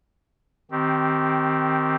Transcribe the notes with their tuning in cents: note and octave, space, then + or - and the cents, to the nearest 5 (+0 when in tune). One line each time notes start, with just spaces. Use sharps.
D#3 +0 C4 +0 G4 -20